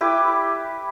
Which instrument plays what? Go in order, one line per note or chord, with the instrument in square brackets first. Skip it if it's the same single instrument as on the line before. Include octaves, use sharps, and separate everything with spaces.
[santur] E4 G4 B4 D6